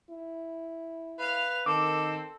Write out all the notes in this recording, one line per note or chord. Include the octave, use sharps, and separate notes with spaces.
E4
B4 F5 F7
D#3 C4 A4 D6